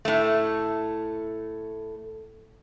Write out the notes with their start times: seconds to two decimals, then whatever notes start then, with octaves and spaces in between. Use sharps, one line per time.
0.05 A2 A3